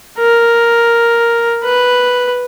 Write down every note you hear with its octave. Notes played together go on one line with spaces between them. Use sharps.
A#4
B4